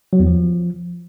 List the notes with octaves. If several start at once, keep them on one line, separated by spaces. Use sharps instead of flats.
F#3
E2
F3